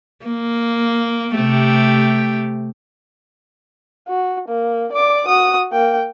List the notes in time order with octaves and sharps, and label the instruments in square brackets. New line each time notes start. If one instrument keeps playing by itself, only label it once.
[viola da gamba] A#3
C3 A3 G4
[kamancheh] F#4
A#3
D5 D6
F#4 D#6
A#3 G5